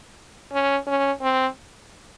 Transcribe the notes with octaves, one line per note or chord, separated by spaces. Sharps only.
C#4
C#4
C4